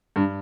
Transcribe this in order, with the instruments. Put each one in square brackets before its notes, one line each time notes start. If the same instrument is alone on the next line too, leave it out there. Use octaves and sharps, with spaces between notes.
[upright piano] G2